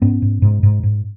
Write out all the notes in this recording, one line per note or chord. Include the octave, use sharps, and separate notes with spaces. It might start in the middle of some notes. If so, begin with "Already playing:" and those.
G#2 B3 C#4
G#2
G#2
G#2
G#2